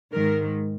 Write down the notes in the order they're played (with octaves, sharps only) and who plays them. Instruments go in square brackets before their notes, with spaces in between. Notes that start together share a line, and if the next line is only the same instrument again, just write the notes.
[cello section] G#2 D#3 A#4